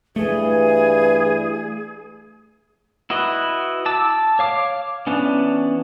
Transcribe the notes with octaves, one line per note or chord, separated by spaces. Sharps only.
G2 E3 A3 G#4
E4 F#4 B4 D#5
A5 D6 E6
C#5 F5 D6
E3 B3 C#4 D4